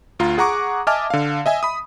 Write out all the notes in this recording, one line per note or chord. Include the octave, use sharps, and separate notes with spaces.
D2 F4 A#5
G#4 F#5 A#5 C#6 D6
D#5 E5 G#5 A5 D6 F6
D3 F5
D#5 E5 G#5
B5 D#6